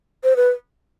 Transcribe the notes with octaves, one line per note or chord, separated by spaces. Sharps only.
C5
B4